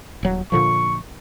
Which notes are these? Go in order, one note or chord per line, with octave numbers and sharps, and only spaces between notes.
D#1 F#3
A#2 D3 F3 C#6